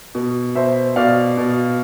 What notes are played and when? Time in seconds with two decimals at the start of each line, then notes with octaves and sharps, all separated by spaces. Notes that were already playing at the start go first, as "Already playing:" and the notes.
0.15 B2
0.55 B2 C5 E5
0.96 B2 D5 F5
1.37 B2